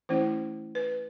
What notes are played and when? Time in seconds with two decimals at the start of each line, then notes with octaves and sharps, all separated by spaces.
0.09 E3 A3 C#4 E4 C5
0.75 B4